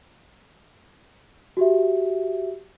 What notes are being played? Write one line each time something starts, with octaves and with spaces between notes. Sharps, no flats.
F#4 G4 E5